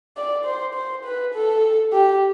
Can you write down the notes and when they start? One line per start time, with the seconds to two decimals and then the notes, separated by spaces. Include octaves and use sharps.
0.17 D5
0.45 C5
0.74 C5
1.05 B4
1.34 A4
1.92 G4